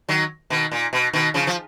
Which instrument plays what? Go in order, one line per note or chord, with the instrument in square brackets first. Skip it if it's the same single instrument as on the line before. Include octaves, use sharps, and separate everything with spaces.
[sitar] D#3 F#3
B2 D#3
A#2
B2
B2 D#3
C#3 F3
F3